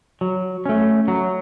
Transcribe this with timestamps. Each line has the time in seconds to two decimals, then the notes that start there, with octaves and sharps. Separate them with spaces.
0.21 F#3
0.65 A3 C#4
1.08 F#3